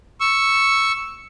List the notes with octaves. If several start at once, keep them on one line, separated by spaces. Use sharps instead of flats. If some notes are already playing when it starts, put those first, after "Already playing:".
C#6 E6